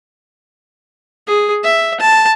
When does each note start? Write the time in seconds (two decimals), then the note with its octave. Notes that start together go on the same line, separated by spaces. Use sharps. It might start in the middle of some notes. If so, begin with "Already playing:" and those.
1.27 G#4
1.64 E5
2.00 A5